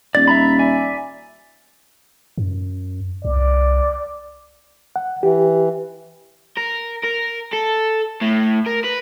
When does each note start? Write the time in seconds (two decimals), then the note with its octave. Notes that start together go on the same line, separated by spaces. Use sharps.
0.15 D#1 D5 A6
0.28 E5 A#5 B5
0.59 D5 E5 G#5
2.38 F#2
3.25 C2 D5
4.96 F#5
5.23 E3 G4
6.57 A#4
7.03 A#4
7.53 A4
8.21 A2
8.67 A#4
8.84 B4